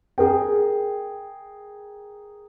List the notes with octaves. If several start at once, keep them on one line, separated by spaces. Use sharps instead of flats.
G#4 A#4 G5